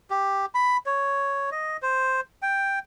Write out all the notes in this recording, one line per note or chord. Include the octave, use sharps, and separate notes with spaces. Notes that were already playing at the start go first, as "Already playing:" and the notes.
G4
B5
C#5
D#5
C5
G5